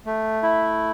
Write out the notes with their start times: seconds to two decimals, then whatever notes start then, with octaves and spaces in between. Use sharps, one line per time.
0.06 A3
0.43 E4